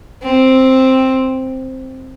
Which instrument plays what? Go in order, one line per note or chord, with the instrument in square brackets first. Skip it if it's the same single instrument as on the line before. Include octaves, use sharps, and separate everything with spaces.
[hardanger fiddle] C4